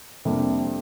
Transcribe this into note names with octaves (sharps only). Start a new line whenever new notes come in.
F2 C3 G3 A#3 D4